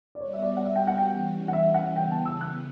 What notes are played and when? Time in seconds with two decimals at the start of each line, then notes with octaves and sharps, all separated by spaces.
0.15 D5
0.21 G3 B3 F#4 C#5
0.33 E5
0.42 D5
0.57 F#5
0.65 E5
0.76 G5
0.87 F#5
0.98 G5
1.09 E3 G3 C#4
1.48 F#5
1.53 E5
1.74 F#5
1.96 C#3 E3 B3 G5
2.11 A5
2.25 E6
2.41 F#6